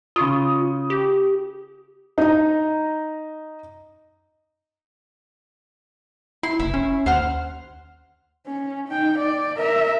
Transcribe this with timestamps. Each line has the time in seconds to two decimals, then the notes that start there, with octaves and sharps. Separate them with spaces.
0.16 C#3 F4 C#6 D#6
0.90 G4
2.18 D#4 A#5
6.43 E4 C6
6.59 F#1 E4
6.74 C#4
7.06 D#2 C5 F#5 F6
8.47 C#4
8.89 D#4 G5
9.19 D5
9.57 A#4 E5